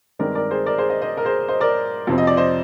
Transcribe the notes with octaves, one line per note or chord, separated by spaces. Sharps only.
G2 D#3 G#3 C4 A#4 D5
A#4 D5
G#4 C5
A#4 D5
G#4 C5
C5 D#5
C5 D#5
A#4
G#4 C5
C5 D#5
A#4 D5
F2 C3 F3 C4
D#5
D5
C5 D#5